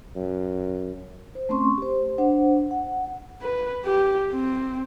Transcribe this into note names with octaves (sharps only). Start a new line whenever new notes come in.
F#2
C5
A3 C4 C#4 C6 C#6
G4 C5
D4 C5 F#5
F#5
B4
G4
C4